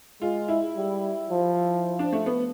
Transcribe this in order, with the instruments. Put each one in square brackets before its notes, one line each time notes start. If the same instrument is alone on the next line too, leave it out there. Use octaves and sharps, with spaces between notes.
[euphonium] G#3 [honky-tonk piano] F4
[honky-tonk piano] E4
[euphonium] G3
F3
[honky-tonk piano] D4
A3
B3